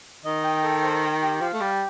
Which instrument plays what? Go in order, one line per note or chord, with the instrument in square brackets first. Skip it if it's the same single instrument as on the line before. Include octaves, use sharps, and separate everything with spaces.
[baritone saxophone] D#3 [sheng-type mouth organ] D#5
[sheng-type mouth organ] G5
A4
C5
G5
G4
[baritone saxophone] F3 [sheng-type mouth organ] F5
[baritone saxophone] A3
[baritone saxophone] G3 [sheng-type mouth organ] G4